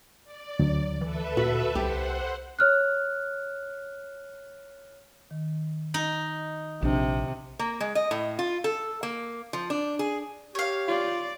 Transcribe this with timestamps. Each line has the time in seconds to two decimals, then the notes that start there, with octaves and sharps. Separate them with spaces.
0.24 D5
0.59 D2 F#3
1.01 E3 A4 B4 E5
1.37 A#2 F#4
1.75 C2 G4 C5 F#5
2.59 C#5 F6 F#6
5.31 D#3
5.94 D#4
6.83 A#1 C3 D4
7.59 A#3
7.80 G#3
7.95 D#5
8.11 A2
8.39 F4
8.64 A4
9.03 A#3
9.53 F3
9.70 D4
9.99 G#4
10.55 G4 C#5 F5
10.88 F4 D5